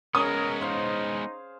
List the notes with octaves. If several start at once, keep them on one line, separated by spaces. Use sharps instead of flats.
G#3 B3 C#4 G#4 A#4 D#6
D#4 C5 F5